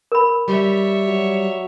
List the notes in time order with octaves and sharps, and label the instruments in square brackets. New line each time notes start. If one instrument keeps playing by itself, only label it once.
[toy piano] A#4 B5
[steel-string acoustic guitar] G3 [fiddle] C#5 E5
[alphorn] F#3